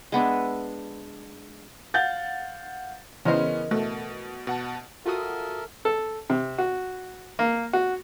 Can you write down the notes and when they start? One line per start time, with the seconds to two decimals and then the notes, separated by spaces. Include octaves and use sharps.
0.12 G#3 B3 D4 E5
1.94 F5 F#5 G6 A6
3.25 C#3 E3 B3 C#4 A#4 C5 D#5
3.71 B2 A3
4.47 B2 F#5 A5
5.06 F4 F#4 A4 A#4 E5 D#6
5.85 A4
6.30 C3
6.58 F#4
7.39 A#3
7.73 F#4